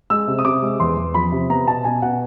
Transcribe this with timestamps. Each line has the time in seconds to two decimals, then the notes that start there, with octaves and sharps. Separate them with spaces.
0.10 G#3 E6
0.28 C3
0.39 D#6
0.45 C3 D6
0.62 G#3
0.80 E2 C6
0.97 E2
1.14 F3 B5
1.32 C3
1.49 B3 A#5
1.68 B2 A5
1.85 B2 G#5
2.02 B2 F#5